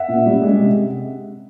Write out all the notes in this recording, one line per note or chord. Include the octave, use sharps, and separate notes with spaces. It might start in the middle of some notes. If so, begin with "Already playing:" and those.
Already playing: E5 F#5
A#2
G3
G#3
C3